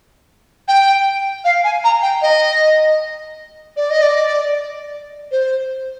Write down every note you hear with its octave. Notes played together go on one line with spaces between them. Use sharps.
G5
F5
G#5
A#5
G5
D#5
D5
D#5
D5
C5